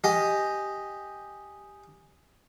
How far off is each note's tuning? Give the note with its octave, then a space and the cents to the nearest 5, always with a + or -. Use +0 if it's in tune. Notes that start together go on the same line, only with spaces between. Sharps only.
G4 +0 D#5 +0 G#5 +0